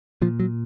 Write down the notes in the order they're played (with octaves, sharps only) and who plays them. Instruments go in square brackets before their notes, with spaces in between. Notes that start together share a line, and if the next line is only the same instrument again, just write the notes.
[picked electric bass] A#2 F3
F#3